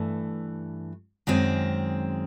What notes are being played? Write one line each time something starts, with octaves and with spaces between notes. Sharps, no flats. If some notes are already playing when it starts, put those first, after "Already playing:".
Already playing: G2 E3 A3
F#2 D#3 G#3 C4